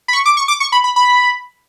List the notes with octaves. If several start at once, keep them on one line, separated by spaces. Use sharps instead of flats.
B5
C#6
D6
C#6
D6
C#6
B5
B5
B5